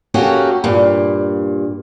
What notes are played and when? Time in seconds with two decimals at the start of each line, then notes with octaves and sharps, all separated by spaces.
0.14 A#3 C#4 F#4 G4 A4
0.64 G2 A#2